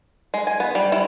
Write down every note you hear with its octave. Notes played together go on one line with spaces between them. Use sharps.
G#3
G#5
B3
G3
E4